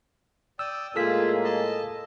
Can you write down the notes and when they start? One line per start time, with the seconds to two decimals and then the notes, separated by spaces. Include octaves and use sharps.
0.59 D5 G5 D#6 E6
0.96 A2 G#3 A#3 F4 G#4 A4 E6 B6
1.44 D#5 A5